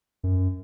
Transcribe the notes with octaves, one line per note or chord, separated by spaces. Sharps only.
F#2